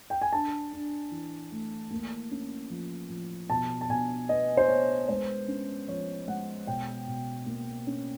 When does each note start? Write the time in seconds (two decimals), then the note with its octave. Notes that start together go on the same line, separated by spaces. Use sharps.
0.10 G5
0.22 G#5
0.33 D4 A5
0.73 D4
1.11 E3
1.51 A3
1.91 A#3
2.31 C#4
2.70 F3
3.10 F3
3.49 B2 A5
3.81 A5
3.89 B2 G#5
4.29 B3 D#5
4.57 C5
4.68 B3 C#5
5.09 G#3 C5
5.48 C#4
5.88 F3 C#5
6.28 G#3 F#5
6.67 B2 G5
7.07 B2
7.46 A#3
7.87 C#4